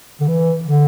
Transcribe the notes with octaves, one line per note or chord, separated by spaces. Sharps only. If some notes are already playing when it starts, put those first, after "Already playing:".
D3
E3
D3